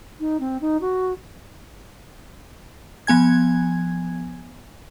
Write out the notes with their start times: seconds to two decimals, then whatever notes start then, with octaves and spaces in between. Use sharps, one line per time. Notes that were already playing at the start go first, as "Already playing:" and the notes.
0.20 D#4
0.40 C4
0.61 D#4
0.81 F#4
3.07 F3 B3 G#5 G#6